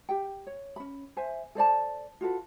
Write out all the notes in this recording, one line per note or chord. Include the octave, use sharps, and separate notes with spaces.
G4 G5
C#5
C#4 B5
C5 E5 G#5
A4 C5 D5 A5
F4 F#4 A4 B4